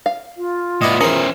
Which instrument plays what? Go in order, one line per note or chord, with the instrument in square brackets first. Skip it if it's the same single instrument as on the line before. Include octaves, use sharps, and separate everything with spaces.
[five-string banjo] F5
[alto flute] F4
[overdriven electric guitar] A2 B3 [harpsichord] E4 D5 D#5
[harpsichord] E3 A#4 [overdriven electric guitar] C#4 C5 [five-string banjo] G#4